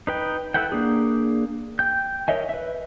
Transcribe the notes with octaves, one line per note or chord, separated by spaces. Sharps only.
D#4 B4 G5
E4 A4 B4 F#5 G5
A#3 D4 G#4
G5 G6
A#4 C#5 D#5 E5 G#5
B4 E5